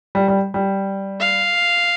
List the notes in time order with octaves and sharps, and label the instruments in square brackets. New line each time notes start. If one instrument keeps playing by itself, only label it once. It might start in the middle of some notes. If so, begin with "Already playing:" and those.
[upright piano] G3
G3
G3
[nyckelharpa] F5